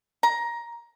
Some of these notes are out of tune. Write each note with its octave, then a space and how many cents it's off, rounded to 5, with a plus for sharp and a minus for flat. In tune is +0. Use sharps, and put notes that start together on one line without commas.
A#5 +15